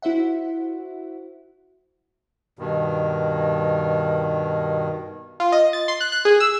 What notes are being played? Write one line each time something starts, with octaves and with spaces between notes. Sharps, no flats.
E4 F#4 C5 E5 F#5
G2 B2 D#3
F4
D#5
A6
C6
F#6
F#6
G#4
E6